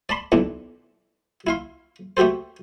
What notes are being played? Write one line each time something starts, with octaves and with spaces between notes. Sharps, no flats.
D5 A5 B5 C6
B1 E3 D4 E4
E4 F5 C6
A3 F#4 G4 A4 C5